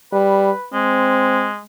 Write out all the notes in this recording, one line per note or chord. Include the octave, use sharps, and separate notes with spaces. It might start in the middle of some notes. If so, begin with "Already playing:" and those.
G3 B4
G#3 C4